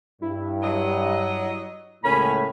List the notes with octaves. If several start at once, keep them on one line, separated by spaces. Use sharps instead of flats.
G2 E4
F#3 D#5
C#2 A2 A#3 C#4 B5